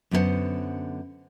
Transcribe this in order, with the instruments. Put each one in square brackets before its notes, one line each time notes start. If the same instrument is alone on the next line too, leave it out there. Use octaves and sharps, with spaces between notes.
[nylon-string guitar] F#2 D3 B3 A#4 C5 F#5